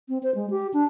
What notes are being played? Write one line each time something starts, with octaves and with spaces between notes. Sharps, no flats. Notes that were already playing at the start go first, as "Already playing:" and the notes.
C4
C5
G#3
G4
D4